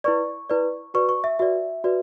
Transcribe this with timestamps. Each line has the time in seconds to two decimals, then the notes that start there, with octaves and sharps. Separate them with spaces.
0.04 E4 B4 D5 C#6
0.50 E4 B4 D5
0.94 F#4 B4 D5 C#6
1.09 C#6
1.24 E5
1.39 F#4 B4 D5 E5
1.84 F#4 B4 D5